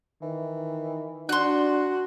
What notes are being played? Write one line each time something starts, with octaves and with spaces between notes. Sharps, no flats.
D#3 E3
D4 F#4 C6 F#6